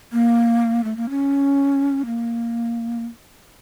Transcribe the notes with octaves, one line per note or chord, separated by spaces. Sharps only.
A#3
A3
A#3
C#4
A#3